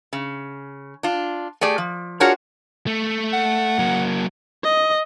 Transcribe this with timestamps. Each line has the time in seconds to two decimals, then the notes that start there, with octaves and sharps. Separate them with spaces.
0.13 C#3
1.03 D4 F4
1.61 A3 G4 G#4 D5
1.78 F3
2.20 D4 F4 F#4 G#4 A#4 C#5
2.87 A3
3.33 F#5
3.79 F#3 A#3
4.64 D#5